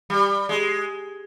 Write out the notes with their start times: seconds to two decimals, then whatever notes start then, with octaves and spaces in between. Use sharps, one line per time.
0.10 G3
0.49 G#3